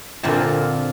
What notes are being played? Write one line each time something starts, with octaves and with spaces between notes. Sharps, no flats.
A#2 D3 A#3 C4 F4 A5